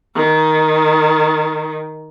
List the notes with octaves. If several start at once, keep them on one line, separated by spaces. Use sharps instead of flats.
D#3